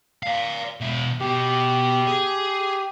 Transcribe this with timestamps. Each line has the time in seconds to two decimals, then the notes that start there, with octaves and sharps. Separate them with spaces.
0.23 D5 F5
0.81 B2 E4
1.20 B2 G4
2.07 G#4